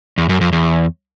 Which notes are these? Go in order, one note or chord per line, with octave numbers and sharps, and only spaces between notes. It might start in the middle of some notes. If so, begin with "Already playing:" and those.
E2
F#2
F2
E2